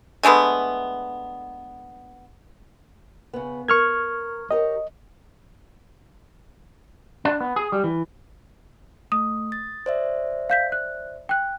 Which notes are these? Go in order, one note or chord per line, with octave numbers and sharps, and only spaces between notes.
D3 G#3 A3 B3
C#3 B3
A#4 C#6 F6 G#6
G4 A#4 C#5 D#5
D4
B3
G#4
G3
E3
A3 D#6
A6
C5 D5 E5
F5 G6 B6
F#6
G5 F#6